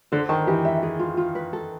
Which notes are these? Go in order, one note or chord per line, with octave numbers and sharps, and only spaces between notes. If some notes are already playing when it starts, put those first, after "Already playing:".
D3 C5
D#3 A5
E3 G4
E5
G#4
F4
F4
B4
A4